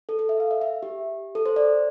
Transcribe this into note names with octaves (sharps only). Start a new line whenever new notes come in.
A4
A4
E5
F5
E5
E5
G4
A4
C5
D5